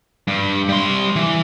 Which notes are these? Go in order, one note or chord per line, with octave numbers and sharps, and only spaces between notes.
G2
G3 C6
E3